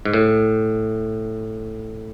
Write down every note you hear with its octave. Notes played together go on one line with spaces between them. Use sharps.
G#2
A2